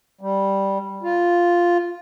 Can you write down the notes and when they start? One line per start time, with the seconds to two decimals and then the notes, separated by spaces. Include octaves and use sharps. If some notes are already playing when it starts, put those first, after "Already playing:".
0.21 G3
1.03 F4